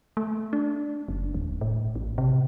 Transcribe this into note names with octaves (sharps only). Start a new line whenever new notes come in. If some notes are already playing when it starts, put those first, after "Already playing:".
A3
D4
F#1
D#1
A2
A1
C3